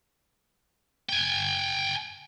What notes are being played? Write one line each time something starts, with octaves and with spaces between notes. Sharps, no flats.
G5 G#5